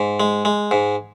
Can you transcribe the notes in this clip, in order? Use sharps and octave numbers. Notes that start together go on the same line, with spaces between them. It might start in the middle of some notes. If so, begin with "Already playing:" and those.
Already playing: G#2
G#3
G#3
G#2